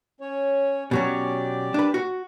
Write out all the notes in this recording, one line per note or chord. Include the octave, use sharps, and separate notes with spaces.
C#4 C#5
B2 F#3 C#4 G4 D5
D4 B4
F#4